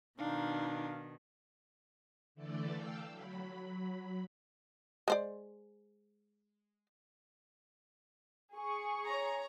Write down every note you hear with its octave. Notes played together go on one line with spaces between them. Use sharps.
B2 D#3 D4 D#4 F5
D3 E3 A3 A4 D5
F5 G5 A5 E6
F#3 B5
G#3 C5 D5
G#4 C#6
C#5 A#5